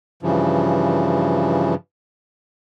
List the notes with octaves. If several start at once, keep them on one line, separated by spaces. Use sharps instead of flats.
G2 C#3 E3 F3